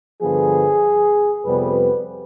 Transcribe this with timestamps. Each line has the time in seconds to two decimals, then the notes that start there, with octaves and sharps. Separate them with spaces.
0.21 G2 D3 F3 B3 G#4
1.45 F2 C3 G3 B3 B4